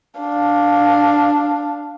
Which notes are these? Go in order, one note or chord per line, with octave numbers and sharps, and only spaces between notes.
D4 F5